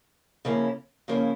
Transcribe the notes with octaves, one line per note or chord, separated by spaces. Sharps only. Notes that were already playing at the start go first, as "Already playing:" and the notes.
C#3 F3 A#3 C#4 E4
C#3 F3 A#3 C#4 E4